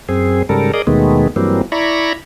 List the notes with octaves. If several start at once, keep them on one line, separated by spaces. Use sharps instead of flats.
F#2 C4 G#4
G#2 C#3 G3 A4 A#4
G#4 A#4 D5 D#5
D#2 B2 D#3 G#3 A3 B3
G2 E3 F#3 G3 A#3 C4
E4 D5 A#5 B5 C#6